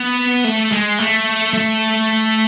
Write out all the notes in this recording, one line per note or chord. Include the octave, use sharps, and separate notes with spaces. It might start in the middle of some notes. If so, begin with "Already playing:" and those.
Already playing: B3
A3
G#3
A3
A3